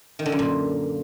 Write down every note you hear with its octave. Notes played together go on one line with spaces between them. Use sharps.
D#3
D3
F#2
A#2